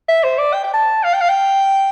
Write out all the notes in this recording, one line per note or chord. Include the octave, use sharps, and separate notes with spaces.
E5
C5
D5
G5
G5
A5
F5
G5
F5
G5